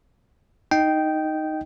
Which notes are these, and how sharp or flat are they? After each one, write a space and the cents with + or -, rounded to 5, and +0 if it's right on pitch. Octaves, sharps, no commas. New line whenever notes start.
D#4 +0 D#5 +0 G5 -10